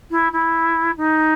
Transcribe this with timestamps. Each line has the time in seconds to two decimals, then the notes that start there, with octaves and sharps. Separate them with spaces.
0.11 E4
0.33 E4
0.97 D#4